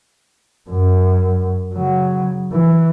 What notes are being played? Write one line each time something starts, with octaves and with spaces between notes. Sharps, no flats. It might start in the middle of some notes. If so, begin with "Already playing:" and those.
F#2
C#3 F#3
E3